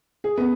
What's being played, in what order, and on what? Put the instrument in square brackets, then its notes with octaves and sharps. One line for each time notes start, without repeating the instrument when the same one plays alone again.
[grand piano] G#4
B3